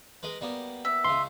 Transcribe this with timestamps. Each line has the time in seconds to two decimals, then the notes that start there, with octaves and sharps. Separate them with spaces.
0.23 G#3 A#4 B4
0.41 G3 A#3 B3
0.85 E5
1.04 C#2 C#3 C6